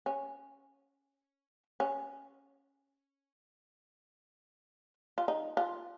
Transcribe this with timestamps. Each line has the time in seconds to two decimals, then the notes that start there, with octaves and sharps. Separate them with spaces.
0.06 C#4
1.80 C#4
5.18 F4
5.28 D#4
5.57 F4